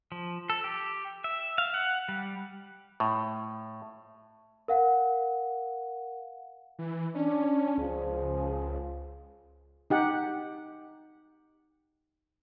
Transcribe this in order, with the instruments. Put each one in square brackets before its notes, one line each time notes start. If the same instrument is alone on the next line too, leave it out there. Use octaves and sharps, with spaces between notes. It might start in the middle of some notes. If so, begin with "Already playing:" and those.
[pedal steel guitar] F3
A4
G4
E5
F5
F#5
G3
[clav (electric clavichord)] A2
[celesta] A#4 F5 F#5
[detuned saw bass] E3
[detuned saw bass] C#4 [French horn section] D4
[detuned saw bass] C#2 [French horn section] F3 G#4
[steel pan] D#4 G4 F#5